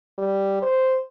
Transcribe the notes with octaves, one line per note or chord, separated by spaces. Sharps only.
G3
C5